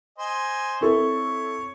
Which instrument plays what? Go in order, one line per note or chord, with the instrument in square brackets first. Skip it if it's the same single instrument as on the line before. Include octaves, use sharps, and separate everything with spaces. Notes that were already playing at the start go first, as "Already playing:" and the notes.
[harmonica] C5 D#5 G#5
[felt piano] C4 E4 A4 [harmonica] C#5